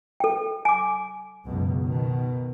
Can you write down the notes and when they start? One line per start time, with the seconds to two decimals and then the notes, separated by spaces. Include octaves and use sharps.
0.20 A4 G5
0.65 G#5 D6
1.45 C#2 F#2 B2
1.83 B2 D#3